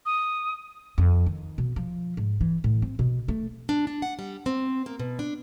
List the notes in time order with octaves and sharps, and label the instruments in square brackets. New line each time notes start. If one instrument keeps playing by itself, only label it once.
[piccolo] D#6
[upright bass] F2
D#3
B2
F3
G#2
E3
A2
C4
B2
A3
[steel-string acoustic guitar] D4
D4
F#5
G3
C4
A#3
B2
D4